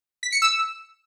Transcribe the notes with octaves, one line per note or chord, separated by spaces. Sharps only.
B6
C#7
E6